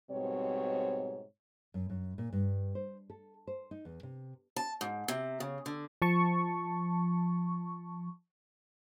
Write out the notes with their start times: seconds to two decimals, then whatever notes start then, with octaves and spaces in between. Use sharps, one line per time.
0.10 G#2 B2 G3 C4 C#5
1.74 F#2
1.90 F#2
2.18 A#2
2.33 G2
2.75 C5
3.10 A4
3.47 C5
3.71 D#4
3.85 E2
4.03 C3
4.56 A5
4.81 G#2
5.08 C3
5.40 C#3
5.66 D3
6.02 F3 A5 C#6